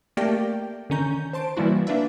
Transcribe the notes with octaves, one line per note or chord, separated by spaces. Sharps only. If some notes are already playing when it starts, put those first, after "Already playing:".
A3 A#3 G4 A#4 D5 G5
D3 D#3 C#4 A#5 G6
C5 A5 C6 D7
E3 F3 G3 A#3 E4 F#4
A#3 D4 B4 D5 E5